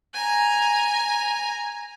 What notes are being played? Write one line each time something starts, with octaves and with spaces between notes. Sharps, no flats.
G#5 A#5